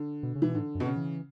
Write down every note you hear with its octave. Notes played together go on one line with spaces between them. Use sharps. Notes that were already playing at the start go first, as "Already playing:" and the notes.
Already playing: D3
B2
C#3
B2 E3
A2 D3
F#2
B2
C#3
E3